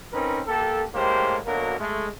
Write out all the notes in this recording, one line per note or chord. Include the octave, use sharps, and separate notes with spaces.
C4 C#4 D#4 A#4 B4
A#3 G4 A4
A2 G#3 A#3 G4 C5
B2 D3 F#3 A#3 A#4
G#3 A3